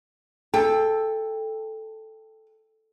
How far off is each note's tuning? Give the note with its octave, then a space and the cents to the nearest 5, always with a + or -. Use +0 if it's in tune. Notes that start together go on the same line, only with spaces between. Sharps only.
A4 +0 G5 +20